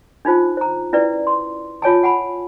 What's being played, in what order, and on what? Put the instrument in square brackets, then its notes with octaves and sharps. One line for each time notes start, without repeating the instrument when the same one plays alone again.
[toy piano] D4 D#4 F4 C5
C5 A#5
C#4 E4 B4 D5
C6
F4 C#5 G#5 A5
F#5 G#5 B5